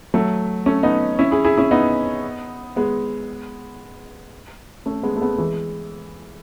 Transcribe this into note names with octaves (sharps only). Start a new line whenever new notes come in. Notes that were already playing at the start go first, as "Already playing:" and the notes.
F#3 A3
A3 C#4
B3 D#4
C#4 E4
E4 G#4
E4 G#4
C#4 E4
B3 D#4
G#3 B3
A3 C#4
G#3 B3
A3
G#3 B3
E3 G#3